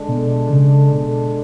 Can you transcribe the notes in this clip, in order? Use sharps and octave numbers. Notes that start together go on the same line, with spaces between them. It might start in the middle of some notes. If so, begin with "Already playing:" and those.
Already playing: D3 G#3 D4 A4
B2
C#3
B2